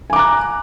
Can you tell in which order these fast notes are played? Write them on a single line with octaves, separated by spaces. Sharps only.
G#5 D6 A#5 F#6